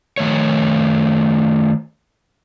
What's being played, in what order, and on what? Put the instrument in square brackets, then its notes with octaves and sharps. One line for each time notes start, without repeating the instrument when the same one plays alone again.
[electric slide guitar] D#3 A3 C#5